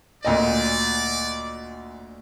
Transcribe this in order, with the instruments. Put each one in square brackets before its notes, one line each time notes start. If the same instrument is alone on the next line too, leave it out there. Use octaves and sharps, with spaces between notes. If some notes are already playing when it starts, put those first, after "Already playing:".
[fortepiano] D2 A#2 D#5 [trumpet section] D5